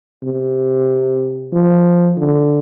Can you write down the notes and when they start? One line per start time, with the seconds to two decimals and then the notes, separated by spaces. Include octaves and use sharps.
0.23 C3
1.53 F3
2.18 D3